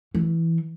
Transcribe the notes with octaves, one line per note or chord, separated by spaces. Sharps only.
E3